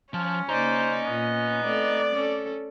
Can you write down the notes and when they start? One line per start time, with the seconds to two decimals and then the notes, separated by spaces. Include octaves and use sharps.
0.14 F3 C#4 F4
0.49 C#3 A#3 C5 D5 D#5 A#5
1.06 A#2 B3
1.64 A3 C4 A4 D5
2.12 C#4 A4